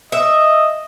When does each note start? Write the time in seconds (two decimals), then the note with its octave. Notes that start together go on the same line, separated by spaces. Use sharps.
0.12 D#5 E5